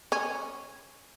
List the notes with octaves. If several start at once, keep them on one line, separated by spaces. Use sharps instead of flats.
C#4